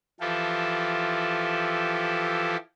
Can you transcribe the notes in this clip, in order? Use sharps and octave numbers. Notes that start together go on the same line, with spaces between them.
E3 F3 E4 F4 G4 A4